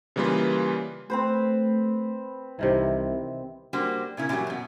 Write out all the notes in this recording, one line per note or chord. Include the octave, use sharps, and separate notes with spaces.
C#3 E3 G3 A#3 F4 B4
A3 C4 B4 C5
C2 C3 D#3 E3
G3 A#3 D4 F#4 C5
A#2 C#3 E4
A#2 D3 E3 F#3 G3
F#2 B2